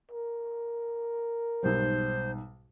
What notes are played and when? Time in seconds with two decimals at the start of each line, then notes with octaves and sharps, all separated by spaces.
0.11 A#4
1.63 B1 G#2 G3 C5